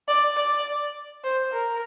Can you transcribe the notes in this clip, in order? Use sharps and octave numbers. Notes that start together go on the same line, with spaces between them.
D5
D5
C5
A#4